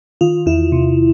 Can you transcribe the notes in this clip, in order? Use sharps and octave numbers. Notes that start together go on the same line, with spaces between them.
D#3 F4
E2 E4
C3